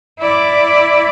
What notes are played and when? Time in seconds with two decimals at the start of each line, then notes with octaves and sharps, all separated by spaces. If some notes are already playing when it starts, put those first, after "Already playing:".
0.19 E4 D5